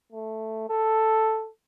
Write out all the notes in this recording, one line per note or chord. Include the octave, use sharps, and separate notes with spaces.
A3
A4